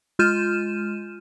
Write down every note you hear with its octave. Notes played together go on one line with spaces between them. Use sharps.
G#3 F4 F6 G6 D#7 E7